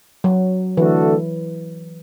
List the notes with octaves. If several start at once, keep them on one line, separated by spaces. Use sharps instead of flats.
F#3
D3 E3 A3 D4 F#4 A4